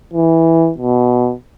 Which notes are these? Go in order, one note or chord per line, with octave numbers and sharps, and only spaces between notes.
E3
B2